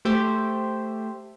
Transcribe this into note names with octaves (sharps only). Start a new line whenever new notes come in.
A3 G4 C5 E5